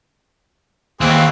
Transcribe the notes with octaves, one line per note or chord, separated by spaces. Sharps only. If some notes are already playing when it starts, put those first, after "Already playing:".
D#2 E3 C4 G#4